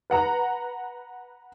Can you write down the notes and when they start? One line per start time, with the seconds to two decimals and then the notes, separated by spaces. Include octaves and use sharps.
0.10 B4 F#5 A#5